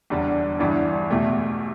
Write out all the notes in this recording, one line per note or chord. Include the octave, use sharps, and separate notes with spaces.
E1 E2 D3 G3 D4
A1 G2 E3 G3 D4
E2 B2 A3 G4